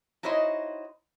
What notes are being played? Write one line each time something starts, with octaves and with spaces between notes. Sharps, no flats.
D#4 E4 F#4 C5 C#5 D#5